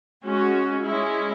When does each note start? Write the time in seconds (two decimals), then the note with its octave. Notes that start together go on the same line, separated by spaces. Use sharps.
0.26 G#3 C#4 F#4
0.85 G#3 C#4 E4